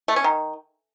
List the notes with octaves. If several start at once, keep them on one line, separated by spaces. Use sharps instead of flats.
A3
C#4
D#3